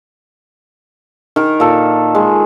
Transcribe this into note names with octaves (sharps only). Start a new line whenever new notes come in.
D#3 A#4
A#2 A4
G#3